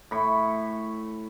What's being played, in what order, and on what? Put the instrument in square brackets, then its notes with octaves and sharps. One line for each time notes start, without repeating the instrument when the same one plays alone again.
[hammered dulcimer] A2 B5 C#6